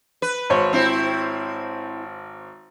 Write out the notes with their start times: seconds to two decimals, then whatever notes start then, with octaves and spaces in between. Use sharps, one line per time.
0.22 B4
0.50 G#1 C5 C#5
0.73 C4 E4